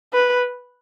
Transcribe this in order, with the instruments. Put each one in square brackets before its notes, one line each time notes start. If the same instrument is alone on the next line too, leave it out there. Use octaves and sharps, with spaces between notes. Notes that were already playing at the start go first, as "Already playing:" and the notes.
[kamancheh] B4